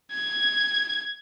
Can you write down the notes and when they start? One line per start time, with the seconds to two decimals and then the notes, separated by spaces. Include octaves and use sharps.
0.12 G#6